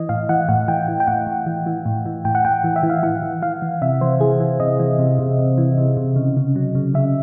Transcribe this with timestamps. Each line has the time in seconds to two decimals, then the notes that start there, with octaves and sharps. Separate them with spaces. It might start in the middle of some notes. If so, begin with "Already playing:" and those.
Already playing: E3 D#5
0.09 A2 F5
0.29 E3 F#5
0.49 A2 F#5
0.68 E3 G5
0.88 E3
1.00 G5
1.07 A2 F#5
1.27 A2
1.46 E3
1.66 E3
1.86 A2
2.06 E3
2.25 A2 G5
2.35 F#5
2.45 A2 G5
2.64 E3
2.76 E5
2.83 E3
2.90 F5
3.03 E3 F#5
3.22 E3
3.42 E3 F5
3.62 E3
3.82 C3 E5
4.01 E3 C5
4.20 E3 G#4
4.40 E3
4.60 C3 D#5
4.79 E3
4.99 C3
5.19 C3
5.39 C3
5.58 E3
5.78 C3
5.97 C3
6.16 C#3
6.37 C#3
6.56 F#3
6.75 C#3
6.94 C#3 E5